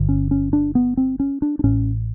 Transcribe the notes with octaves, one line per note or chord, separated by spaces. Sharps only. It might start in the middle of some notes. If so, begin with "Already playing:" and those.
Already playing: G1 G2 D3
C#4
C#4
D4
B3
C4
C#4
D4
D4
A1 A2 C#4